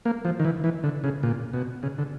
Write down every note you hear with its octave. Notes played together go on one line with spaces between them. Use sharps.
A#3
F3
D#3
E3
E3
D3
C#3
A#2
B2
C#3
D3